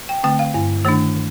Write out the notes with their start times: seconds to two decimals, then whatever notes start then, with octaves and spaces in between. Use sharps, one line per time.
0.09 G5
0.23 D3 A3 C4 G5
0.39 F5
0.54 G2
0.85 D#3 A3 D4